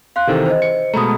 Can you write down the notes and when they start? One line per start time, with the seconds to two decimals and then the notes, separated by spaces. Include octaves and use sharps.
0.16 F5 C6 F#6
0.27 C3 D#3 E3 G4 A4 C5
0.45 C5 D#5
0.62 C#7
0.94 B2 G#3 A3 A#5 B5 D#6